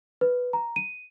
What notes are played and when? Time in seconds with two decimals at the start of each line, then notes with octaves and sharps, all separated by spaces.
0.21 B4
0.53 A#5
0.76 D#7